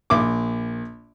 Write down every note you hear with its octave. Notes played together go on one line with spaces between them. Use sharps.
A#1 D6